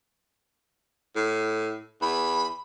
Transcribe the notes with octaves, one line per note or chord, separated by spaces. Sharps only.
A2
E2 B5